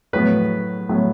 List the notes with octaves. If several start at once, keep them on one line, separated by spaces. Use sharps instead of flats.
A2 F#3 B3 B4
A2 F#3 B3